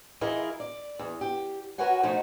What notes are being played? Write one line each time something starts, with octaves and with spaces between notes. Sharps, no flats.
E3 E4 F4 G#4 A#4 D#5
D5
E2
G4
F#4 A#4 B4 C#5 F#5 G#5
B2 F3 A3 D#4 F#4